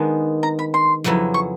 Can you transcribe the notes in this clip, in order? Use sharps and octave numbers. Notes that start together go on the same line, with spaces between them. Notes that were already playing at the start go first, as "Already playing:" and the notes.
Already playing: D#3 G#3 B3 D4
A#5
B5
C6
F2 C#3 F#3 B3 E4
C#6